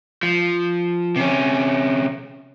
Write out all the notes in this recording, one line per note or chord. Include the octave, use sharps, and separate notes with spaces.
F3
C3 C#4